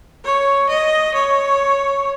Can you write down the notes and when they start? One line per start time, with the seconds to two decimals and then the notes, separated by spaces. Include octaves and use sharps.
0.25 C#5
0.69 D#5
1.14 C#5